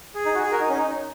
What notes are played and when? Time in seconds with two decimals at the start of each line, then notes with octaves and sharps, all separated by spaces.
0.15 G#4
0.25 D#4
0.35 F#4
0.43 G#4
0.51 F#4 A#4
0.60 D#4
0.69 C#4
0.78 D#4